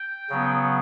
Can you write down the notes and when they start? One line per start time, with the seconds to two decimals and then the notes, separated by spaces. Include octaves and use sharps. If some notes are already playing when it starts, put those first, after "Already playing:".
Already playing: G5
0.30 C#3 F#3 B3